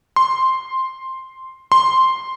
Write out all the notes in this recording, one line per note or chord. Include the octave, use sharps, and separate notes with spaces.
C6
C6